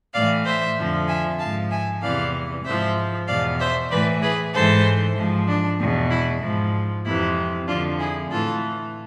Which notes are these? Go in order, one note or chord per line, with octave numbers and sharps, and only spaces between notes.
A2 E3 D5 F5
C5 E5
F2 D3 F3
E5 G#5
G#2 F3 F5 A5
E5 G#5
E2 C3 E3 D5 F5
G#2 F3 C5 E5
E2 B2 D5 F5
C5 E5
A2 E3 B4 D5
G#4 B4
G#2 E3 A4 C5
G#2 F3
D4
E2 B2
E4
G#2 F3
F2 C3 E3 E4
F2 D3 F3 D4 F4
E4 G#4
A2 E3 F4 A4